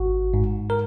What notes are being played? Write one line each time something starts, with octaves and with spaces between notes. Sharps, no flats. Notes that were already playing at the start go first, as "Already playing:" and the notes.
Already playing: G#1 F#4
G#2
A#4